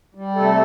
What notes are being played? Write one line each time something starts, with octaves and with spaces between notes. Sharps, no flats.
G3
C3 A3 A4